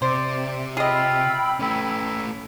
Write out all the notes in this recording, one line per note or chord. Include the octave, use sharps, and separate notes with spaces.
C3 C5 D5
F4 G#4 D#5 G5 B5 E6
A3 C#4 E4